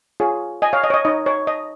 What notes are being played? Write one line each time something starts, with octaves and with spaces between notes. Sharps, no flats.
F4 G#4 C#5
D#5 G#5
C#5 F5
D#5
C#5
D#5
D#4 C#5 D#5
C#5
D#5